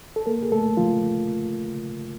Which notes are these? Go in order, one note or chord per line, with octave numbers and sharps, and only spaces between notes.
A4
A#3 A#4
G#4
A3 A4
F3 F4